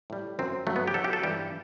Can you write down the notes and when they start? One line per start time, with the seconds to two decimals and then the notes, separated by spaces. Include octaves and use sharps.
0.10 A2 G3
0.39 F#2 F#3 C4
0.67 G2 F#3 A3
0.76 B3
0.88 G4
0.94 B2 F#3 A4
1.04 G4
1.13 A4
1.23 G2 E3 G3 G4